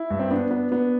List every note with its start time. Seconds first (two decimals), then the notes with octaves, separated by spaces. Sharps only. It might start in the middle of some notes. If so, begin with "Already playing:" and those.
Already playing: E4
0.10 G2
0.19 C4
0.31 B3 D4
0.51 B3
0.72 B3